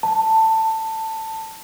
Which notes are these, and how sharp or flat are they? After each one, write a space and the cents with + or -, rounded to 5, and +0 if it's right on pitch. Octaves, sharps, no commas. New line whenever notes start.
A5 +15